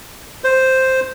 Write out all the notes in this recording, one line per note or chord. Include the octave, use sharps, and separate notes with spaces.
C5